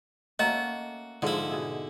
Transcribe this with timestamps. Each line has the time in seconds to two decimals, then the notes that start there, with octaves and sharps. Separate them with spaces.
0.39 A3 A#3 C#4 F#4 D#5
1.22 G#2 D3 F3 G#3 E4
1.50 B2 G#4 E5